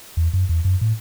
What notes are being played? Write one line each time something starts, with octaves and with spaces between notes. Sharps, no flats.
E2
F#2
E2
F#2
A2